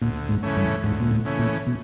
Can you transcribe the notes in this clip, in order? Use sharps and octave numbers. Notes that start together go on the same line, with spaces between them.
D2 A#2
G#2
C#3 E3 A3 C#4
G2
D2 G#2
A#2
A2
C#3 E3 A3 C#4
A#2
B2